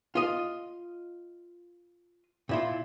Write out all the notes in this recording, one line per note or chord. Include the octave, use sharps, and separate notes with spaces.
F4 D#5
A#2 E4 F4